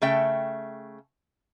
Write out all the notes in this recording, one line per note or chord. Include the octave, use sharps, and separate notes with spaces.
C#3 A3 E5 G5